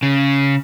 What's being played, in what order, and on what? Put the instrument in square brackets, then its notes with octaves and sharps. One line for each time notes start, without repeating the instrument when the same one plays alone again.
[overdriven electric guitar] C#3